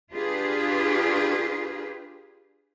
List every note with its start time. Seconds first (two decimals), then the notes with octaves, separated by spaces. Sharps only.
0.13 D4 F4 G4 G#4 B4